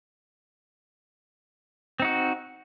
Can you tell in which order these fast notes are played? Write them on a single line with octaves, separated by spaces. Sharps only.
C4 D#4 F#4